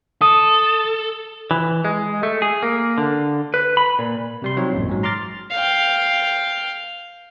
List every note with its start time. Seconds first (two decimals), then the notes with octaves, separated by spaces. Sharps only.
0.22 A4 D#6
1.51 E3
1.85 G#3
2.23 A3
2.42 G#4
2.63 A#3
2.98 D3
3.54 B4
3.77 B5
3.99 A#2
4.42 C3 G3 C6
4.57 F#3 C4 D#4 F4 C#5
4.73 A1 F#2 A#2
4.89 G#2 F#3
5.03 A#5 C6 D6 F6 A6
5.51 F5 G5